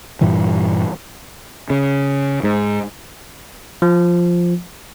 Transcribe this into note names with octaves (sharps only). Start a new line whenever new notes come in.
G2 A#2 E3 G3
C#3
G#2
F3